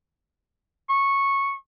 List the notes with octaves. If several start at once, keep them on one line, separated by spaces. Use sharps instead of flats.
C#6